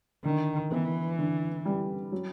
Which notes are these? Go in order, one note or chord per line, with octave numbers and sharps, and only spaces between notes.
D3 D#3
E3 B3
D3
G3
F#3